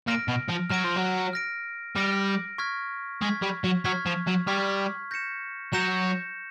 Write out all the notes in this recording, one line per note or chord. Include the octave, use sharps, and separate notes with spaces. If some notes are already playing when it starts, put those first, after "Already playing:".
A#2 F6 A#6 D7
B2
F3
F#3 F6 A#6 D7
F3
F#3
F6 A#6 D7
G3 F6 A#6 D7
C#6 F6 G#6 B6
G#3 C#6 F6 G#6 B6
G3
F#3
F#3 C#6 F6 G#6 B6
F3
F#3
G3 C#6 F6 G#6 B6
G6 A#6 C#7 E7
F#3 G6 A#6 C#7 E7